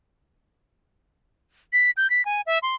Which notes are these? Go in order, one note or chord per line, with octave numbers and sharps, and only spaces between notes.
B6
G6
B6
G#5
E5
C6